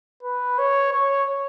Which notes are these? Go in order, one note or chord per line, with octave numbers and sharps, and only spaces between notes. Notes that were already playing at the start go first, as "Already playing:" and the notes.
B4
C#5
C#5